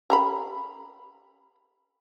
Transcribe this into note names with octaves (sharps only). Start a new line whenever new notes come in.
G4 A#5 B5